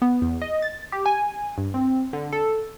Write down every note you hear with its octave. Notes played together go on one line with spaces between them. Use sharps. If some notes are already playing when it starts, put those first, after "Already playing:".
B3
E2
D#5
A6
G4
G#5
G2
C4
D3
A4